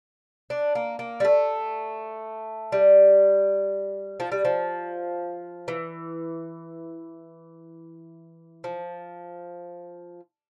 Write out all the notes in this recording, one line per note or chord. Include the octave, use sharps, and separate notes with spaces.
D4
A#3
A#3
G3
A3
G3
F3
G3
F3
E3
F3